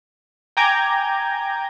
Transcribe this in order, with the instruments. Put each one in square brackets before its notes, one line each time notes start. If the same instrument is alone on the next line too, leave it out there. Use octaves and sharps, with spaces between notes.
[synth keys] G5 G#5 A#5 D6 G6 G#6